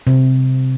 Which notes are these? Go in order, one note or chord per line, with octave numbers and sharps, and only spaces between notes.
C3